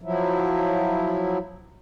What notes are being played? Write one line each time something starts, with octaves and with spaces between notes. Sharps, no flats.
F3 F#3 E4